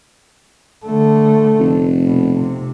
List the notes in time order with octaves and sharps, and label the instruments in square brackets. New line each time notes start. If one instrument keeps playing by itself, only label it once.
[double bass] D3 A3
[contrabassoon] F1
[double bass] B2
C3